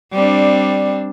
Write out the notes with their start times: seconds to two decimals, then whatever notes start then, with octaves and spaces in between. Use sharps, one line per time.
0.13 G3 C4 D4